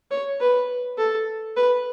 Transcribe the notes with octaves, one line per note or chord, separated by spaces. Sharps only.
C#5
B4
A4
B4